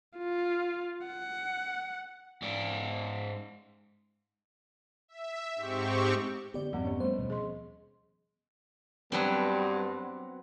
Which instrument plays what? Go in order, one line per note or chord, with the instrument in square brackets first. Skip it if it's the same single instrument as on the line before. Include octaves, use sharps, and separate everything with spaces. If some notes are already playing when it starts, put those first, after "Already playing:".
[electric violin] F4
F#5
[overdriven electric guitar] G#2 D5
[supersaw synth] E5
G#2 C4 G4 C#6
[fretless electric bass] D3 B3 [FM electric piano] G4 D5
[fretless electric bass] F2 G#2 A#3 [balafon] F3 C4 [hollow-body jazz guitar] G3 F#5
[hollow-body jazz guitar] B3 C#4
[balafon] F3 G3 [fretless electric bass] A3 [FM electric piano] C5
[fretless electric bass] D#2 B2
[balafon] G#4 D#5 C6
[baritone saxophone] G2 [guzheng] F#3 B3 C4